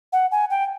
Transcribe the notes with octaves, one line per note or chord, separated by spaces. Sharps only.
F#5
G#5
G5